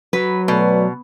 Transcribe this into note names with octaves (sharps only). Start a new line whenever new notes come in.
F#3 B4
B2 A3 B4 D5